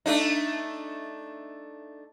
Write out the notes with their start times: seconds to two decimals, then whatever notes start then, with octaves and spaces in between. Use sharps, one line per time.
0.06 A3 D4 D#4